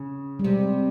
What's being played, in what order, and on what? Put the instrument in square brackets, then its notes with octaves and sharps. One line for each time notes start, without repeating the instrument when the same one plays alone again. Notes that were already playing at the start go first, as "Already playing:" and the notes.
Already playing: [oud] C#3
[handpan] G3
[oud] C3 [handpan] G#3
[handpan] G#3